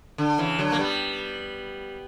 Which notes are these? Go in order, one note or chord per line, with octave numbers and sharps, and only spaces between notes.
D3
C#3 E3
D3 F#3
A#3
G3 B3